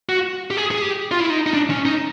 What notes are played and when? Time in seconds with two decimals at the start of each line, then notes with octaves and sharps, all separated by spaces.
0.09 F#4
0.51 G4
0.57 G#4
0.71 G#4
0.82 G4
1.11 F4
1.20 E4
1.30 D#4
1.46 D#4
1.54 D4
1.70 C#4
1.85 D#4